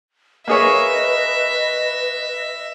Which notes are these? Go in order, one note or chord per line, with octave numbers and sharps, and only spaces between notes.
A#3 G#4 B4 C#5 D#5 E5